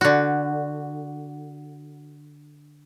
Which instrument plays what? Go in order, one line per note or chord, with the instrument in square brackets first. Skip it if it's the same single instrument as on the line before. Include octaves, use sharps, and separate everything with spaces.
[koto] D3 F#4